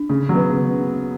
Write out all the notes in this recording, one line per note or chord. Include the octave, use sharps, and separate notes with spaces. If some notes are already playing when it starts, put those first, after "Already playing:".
Already playing: D4
C#3
F#3 B3
C#3